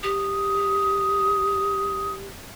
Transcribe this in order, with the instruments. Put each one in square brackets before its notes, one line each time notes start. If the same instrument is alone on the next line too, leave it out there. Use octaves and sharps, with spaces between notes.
[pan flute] G4 [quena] D#6